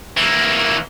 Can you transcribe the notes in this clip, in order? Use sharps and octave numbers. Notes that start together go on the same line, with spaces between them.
E3 A#3